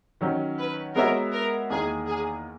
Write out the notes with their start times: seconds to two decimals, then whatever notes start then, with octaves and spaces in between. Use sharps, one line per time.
0.21 D#3 F#3 C#4
0.59 B4
0.95 G#3 B3 F#4 A#4 C#5 E5
1.32 A#4
1.70 E2 D#3 A#3 G#4
2.07 G#4